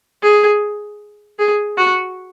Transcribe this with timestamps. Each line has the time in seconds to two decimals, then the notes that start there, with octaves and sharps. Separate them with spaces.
0.23 G#4
1.39 G#4
1.78 F#4